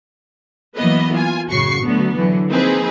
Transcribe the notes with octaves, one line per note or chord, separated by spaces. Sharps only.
E3 F#3 A#3 B3 B4 D#5
F4 G#5
A1 F#2 C#3 F#4 C#6 C7
D3 F#3 A3 B3
D3 E3 F#3
F3 A#3 C4 D#4 G#4 B4